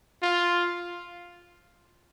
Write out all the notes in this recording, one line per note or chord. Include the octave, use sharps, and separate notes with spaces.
F4